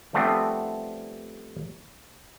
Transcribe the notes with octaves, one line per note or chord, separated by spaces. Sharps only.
F3 G3 A3 B3 C4 D4